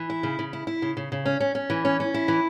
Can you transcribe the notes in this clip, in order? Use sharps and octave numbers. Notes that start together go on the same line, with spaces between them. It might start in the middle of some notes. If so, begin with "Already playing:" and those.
Already playing: E3
E4
C#3
C#3
E4
E4
C#3
C#3
C#3
C#4
C#4
C#4
E3
C#4
C#4
E4
E3